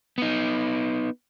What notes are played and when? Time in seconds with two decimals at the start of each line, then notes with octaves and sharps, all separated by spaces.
0.18 B3 D#4